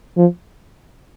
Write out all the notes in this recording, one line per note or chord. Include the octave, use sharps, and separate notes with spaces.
F3